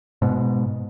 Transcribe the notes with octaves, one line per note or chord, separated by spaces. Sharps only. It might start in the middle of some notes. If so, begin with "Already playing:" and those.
G#2 B2